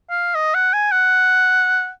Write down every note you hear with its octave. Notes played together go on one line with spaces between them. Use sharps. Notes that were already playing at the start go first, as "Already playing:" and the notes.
F5
D#5
F#5
G#5
F#5